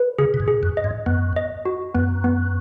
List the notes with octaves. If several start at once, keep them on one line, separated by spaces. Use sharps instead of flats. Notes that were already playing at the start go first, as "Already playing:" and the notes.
Already playing: B4
C#3 G#4
B2
G#2
G#4
F#2
D#5
G#2
F#2 B3
D#5
F#4
F#2 B3
B3